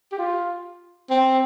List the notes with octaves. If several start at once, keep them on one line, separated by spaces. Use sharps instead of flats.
G4
F4
C4